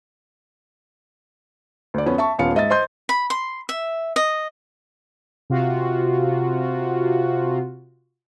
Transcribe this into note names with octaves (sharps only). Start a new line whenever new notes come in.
D2 D5
F2 B3 C#4
E5 A5 C#6
D#1 B3 C#4 F4 F5 C#7
G#2 D#5 E5 A6
C5 D#5 C6 G6
B5
C6
E5
D#5
C3 F4 F#4